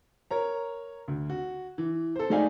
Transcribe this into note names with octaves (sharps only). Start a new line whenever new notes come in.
A#4 C#5 A#5
D2
F#4
E3
A4 C5
G#3 A3 D#4 D5 F5 G#5